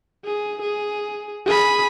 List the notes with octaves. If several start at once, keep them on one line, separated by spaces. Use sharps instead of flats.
G#4
G#4
G#4 B5